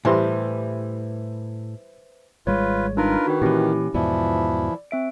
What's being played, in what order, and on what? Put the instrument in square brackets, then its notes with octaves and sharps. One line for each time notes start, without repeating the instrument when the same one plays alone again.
[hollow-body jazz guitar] A2 [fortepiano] E3 G3 C6 [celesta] B4 C5 E5
[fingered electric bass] G#1 G3 G#3 [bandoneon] F4 B4 [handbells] C#5
[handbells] D4 D#4 B5 [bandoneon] F4 A#4 B4
[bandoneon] D#3 [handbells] F#4 B4
[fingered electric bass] A#2 E3 [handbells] C#4 E4 G4
[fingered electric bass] E2 G#2 B2 [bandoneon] E3 F3 E4 [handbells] D5
[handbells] C4 E5 D7